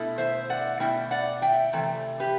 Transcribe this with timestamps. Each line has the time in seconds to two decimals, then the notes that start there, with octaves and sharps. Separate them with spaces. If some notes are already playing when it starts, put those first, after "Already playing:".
Already playing: B2 A3 E4
0.18 C5 E5
0.50 D5 F#5
0.80 B2 A3 E4 E5 G5
1.11 D5 F#5
1.42 E5 G5
1.73 C3 E3 A3 G5
2.20 G4 B4